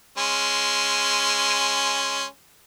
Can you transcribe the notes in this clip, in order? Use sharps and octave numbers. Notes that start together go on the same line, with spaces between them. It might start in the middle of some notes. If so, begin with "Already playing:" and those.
G#3 C#4 C6